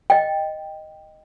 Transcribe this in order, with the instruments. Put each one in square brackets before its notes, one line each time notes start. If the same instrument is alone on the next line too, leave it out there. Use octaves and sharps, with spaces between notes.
[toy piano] D#5 G5